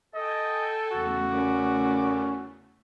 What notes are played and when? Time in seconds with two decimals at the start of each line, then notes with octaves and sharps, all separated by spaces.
0.15 A4 D#5 G5 G#5
0.92 E2 C#3 A3 F#4
1.31 A#2 B3 C#4 D6